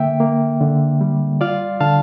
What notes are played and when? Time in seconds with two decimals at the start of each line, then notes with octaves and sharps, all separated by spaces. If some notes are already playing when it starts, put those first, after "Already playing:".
Already playing: D3 A#3 E5 G5
0.20 A#3
0.61 D3
1.01 G3
1.41 F4 D5 F5
1.80 D3 F5 A5